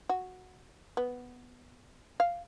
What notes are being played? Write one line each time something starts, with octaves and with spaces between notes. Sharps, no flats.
F#4
B3
F5